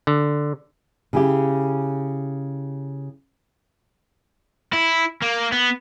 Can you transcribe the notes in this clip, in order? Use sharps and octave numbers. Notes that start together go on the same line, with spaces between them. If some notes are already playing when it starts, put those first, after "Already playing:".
D3
C#3 E4 G4
E4
A#3
B3